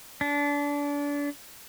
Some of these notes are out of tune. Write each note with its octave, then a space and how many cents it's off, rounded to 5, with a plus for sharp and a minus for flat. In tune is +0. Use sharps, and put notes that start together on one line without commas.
D4 -30